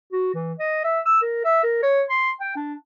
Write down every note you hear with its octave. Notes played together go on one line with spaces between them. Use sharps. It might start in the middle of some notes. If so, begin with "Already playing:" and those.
F#4
E3
D#5
E5
E6
A#4
E5
A#4
C#5
C6
G5
D4